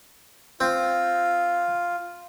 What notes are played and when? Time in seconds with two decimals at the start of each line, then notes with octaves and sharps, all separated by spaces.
0.61 C4 F4